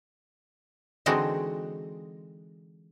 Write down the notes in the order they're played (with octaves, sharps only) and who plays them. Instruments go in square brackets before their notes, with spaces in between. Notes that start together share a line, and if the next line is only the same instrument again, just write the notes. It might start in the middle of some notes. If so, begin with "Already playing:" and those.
[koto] D3 E3 G#3 C4 D#4 F#4